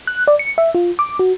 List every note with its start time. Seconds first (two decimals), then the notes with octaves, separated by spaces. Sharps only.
0.07 F#6
0.28 D5
0.39 C#7
0.58 E5
0.75 F4
0.99 D6
1.19 F#4